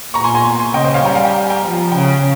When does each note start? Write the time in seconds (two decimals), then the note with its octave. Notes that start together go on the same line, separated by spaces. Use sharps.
0.14 A#2 A#5 C#6
0.24 G#5 C6
0.35 G#5 C6
0.59 G#5 C6
0.74 C#3 D#5 G5
0.85 C5 D#5
0.94 C#5 F5
1.04 G3 G5 A#5
1.15 F5 G#5
1.25 G5 A#5
1.43 G#5
1.50 G5 A#5
1.65 F3 A#5
1.79 G#5
1.92 C#3 G5 A#5